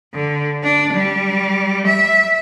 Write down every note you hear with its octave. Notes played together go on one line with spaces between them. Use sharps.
D3
D4
G3
E5